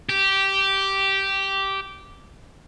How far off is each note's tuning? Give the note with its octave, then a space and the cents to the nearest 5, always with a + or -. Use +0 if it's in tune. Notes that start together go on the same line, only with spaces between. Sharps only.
G4 -10